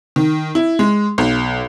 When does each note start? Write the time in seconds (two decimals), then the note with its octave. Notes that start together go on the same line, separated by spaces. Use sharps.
0.16 D#3
0.55 E4
0.79 G#3
1.18 B1